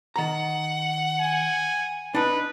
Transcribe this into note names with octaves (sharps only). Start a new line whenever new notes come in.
D#3 F#5 A#5
G#5
D4 D#4 B4